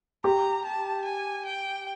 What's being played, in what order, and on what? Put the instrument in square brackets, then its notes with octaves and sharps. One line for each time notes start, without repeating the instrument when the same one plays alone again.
[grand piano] G4 [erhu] A#5
[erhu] A5
G#5
G5